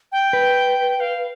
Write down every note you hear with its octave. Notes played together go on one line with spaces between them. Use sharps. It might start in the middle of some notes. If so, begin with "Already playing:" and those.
G5
B4
F5